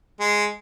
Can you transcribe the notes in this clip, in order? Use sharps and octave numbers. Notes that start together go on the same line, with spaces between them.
G#3